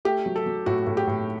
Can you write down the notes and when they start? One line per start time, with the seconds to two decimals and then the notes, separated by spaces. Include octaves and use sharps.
0.05 A3 G4
0.26 F#3
0.36 A4
0.46 F#3
0.66 A2 F#4
0.87 A2
0.97 G4
1.08 A2